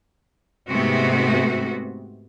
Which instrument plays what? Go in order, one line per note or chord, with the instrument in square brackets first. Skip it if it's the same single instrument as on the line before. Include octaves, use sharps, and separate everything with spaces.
[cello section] G#2 C3 A3 B3 C4 F#4